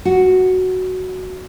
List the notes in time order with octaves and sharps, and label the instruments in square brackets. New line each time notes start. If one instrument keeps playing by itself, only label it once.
[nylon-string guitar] F#4